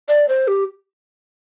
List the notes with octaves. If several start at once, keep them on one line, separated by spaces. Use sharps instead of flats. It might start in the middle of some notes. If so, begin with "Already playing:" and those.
D5
C5
G4